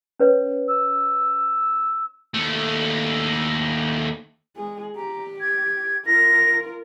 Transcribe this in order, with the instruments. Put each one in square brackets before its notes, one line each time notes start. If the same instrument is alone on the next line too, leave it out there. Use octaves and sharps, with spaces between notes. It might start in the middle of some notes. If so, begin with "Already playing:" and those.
[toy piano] C#4 B4 C#5
[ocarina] E6
[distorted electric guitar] D#2 A3
[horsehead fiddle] G#3 G#4
[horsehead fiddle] G4 [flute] A#5
[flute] G#6
[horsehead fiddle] F4 A#4 [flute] A#6